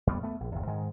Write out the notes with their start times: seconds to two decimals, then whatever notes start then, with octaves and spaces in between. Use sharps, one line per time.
0.07 F2 G3 B3
0.23 A3 B3
0.40 A#1
0.52 G1 E2
0.67 G#2 D#3 G#3